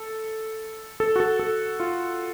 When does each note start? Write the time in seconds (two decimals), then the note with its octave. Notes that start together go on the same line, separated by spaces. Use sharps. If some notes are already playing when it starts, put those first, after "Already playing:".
Already playing: A4
1.00 A4
1.16 F#4
1.20 A4
1.39 A4
1.80 F4